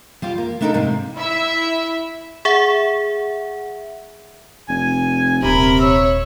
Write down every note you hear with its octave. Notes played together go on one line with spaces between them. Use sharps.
G3 F4 G4
A#3
A3 D4 D#4 F#4 A4 A#4
G#2 C3 G3 A#3
E4 E5
G#4 E5 F#5
F1 G#5
D#1 C3 A#4 B5
C#5 E5